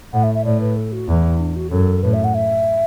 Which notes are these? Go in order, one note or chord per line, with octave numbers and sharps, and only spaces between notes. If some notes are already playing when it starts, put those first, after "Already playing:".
A2 F#5
E5
E5
A2 D5
B4
A4
F#4
E2 E4
D4
F#4
F#2 A4
A2 B4
E5
F#5
E5